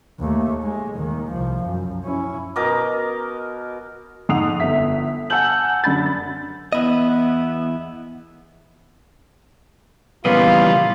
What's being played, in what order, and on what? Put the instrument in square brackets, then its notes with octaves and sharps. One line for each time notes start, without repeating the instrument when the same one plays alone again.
[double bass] D#2 A3
G#3
D#2 D#3
C2 F3
F#2
C#4 E4
[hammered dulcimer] B2 A#4 D#5 D6
[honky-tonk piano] F2 G#2 F#5 D#6 C7 F7
G1 E5 B6
F#5 G#5 A5 E6 G6 F#7
F#2 D3 B5 A6
[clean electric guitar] E2 E4 D#5 [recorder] B3
[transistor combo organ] A#2 C#3 F3 [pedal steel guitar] E3 G3 D#5 [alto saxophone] B3 [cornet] F4